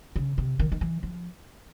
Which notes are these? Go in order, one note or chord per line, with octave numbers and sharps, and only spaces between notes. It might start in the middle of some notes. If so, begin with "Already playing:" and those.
C#3
C3
D#3
D#3
E3
F3